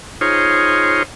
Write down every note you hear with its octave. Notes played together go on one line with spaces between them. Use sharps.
D#4 F4 G#4 C5 C#5